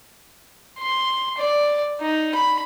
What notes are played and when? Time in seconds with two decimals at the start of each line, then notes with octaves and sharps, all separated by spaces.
0.79 C6
1.38 D5
2.01 D#4
2.35 B5